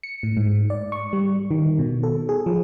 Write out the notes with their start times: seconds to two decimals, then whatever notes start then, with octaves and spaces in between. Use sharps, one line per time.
0.03 C#7
0.23 A2
0.37 G#2
0.70 D5
0.92 C#6
1.13 G3
1.51 D#3
1.79 B2
2.03 A4
2.29 G#4
2.46 F3